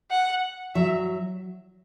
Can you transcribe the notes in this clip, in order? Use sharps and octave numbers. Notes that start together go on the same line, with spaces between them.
F#5
F#3 E5